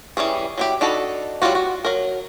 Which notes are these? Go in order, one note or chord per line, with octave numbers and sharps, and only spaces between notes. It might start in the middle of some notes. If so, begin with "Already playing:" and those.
E3 G3 C#4 G#4
F#3 E4 G4
D4 D#4 F#4 A4 B5
F#3 G3 C#4 F4 F#4
F#4
F#3 A#4